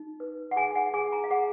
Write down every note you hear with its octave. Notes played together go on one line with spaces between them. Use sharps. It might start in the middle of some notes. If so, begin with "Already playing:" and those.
Already playing: D#4
B4
F#5
G#4 G#5
F#5
G#4 G#5
A#5
F5
G#4 F#5